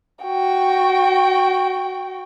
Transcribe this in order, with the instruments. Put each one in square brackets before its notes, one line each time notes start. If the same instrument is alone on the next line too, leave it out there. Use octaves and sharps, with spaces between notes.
[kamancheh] F#4 G5